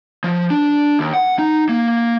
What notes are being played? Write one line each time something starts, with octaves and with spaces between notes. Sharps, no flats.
F3
D4
D#2
F#5
D#4
A#3